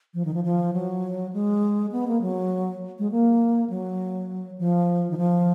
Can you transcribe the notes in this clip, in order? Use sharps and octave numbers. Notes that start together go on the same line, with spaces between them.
F3
D#3
F3
F3
F#3
G#3
B3
A#3
F#3
G#3
A#3
F#3
F3
D#3
F3